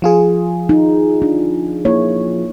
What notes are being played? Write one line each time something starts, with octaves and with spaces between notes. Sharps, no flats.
F3 F4 G#4
D#4
D4
A#3 E4 C#5